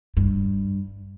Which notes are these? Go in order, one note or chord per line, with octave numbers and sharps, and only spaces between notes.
G2